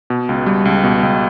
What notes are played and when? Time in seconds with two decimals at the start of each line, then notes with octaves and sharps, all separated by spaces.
0.10 B2
0.29 C#2
0.46 G3
0.65 C#2
0.84 B2
1.03 C#2